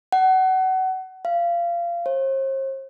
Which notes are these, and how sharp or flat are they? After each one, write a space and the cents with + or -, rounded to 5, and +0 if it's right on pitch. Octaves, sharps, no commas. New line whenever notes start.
F#5 +25
F5 -25
C5 +45